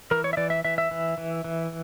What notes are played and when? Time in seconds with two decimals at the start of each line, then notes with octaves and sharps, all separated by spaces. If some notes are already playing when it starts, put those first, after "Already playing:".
0.11 E3 A#4
0.24 C#5
0.33 E5
0.37 E3 D5
0.50 E5
0.65 E3 E5
0.78 E5
0.91 E3
1.18 E3
1.44 E3